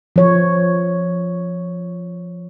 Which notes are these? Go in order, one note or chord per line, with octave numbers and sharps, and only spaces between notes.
F3 C#5